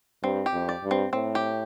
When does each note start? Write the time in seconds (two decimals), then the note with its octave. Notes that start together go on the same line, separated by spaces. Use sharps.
0.23 G2 C4
0.46 G4
0.53 F2
0.69 D5
0.84 G2
0.91 C4
1.13 A2 C4
1.35 G4